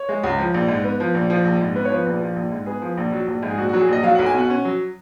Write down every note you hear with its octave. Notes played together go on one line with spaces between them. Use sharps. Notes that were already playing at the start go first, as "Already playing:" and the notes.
Already playing: C#5
G#3
C#2
F3
A#1
G#2
B3
F3
A#1
F3
A#1
G#2
B3 B4
C#5
F3 B4
A#1
F3
A#1
G#2
B3 G#4
F3
A#1
F#3
A#1
G#2
G#4
A#1 F#4
F#4
F#3
G#4
A#1 D#5
F#3 F5
F#5
B1
G#5
B2 F#5
C#4
F#3